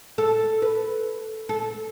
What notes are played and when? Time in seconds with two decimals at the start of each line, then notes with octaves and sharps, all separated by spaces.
0.18 A4
0.62 B4
1.49 A4